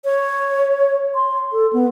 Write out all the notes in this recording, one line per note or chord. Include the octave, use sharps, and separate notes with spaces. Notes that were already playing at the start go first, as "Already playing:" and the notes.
C#5
C6
A4
B3